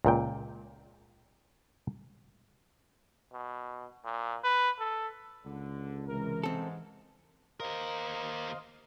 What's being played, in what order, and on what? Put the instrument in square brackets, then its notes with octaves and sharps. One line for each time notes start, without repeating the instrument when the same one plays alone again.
[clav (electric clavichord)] C#2 A#2 G5
[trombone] B2
A#2
B4
A4
[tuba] C#2 [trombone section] D3
[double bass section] C3 E3 G#3 [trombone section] A#4
[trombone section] G#2 [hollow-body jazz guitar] C4 A4
[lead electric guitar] D#2 A#4 [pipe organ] C5 D#5 F5